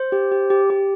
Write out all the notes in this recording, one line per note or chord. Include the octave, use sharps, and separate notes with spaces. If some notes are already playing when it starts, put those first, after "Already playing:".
Already playing: C5
G4
G4
G4
G4